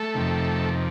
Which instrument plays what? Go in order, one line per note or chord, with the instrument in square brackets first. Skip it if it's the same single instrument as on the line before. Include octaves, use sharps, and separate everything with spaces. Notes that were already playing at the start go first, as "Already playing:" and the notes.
Already playing: [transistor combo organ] A3 A4
F2 C3 D#3